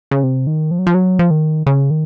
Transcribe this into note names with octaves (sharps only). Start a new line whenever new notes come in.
C#3
C3
D#3
F3
F#3
F3
F#3
F3
D#3
C#3
D#3